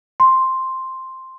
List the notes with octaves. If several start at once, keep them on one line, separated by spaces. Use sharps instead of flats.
C6